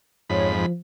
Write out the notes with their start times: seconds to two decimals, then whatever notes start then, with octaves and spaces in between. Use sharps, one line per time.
0.30 F2 G#2 C#5 B5
0.52 F3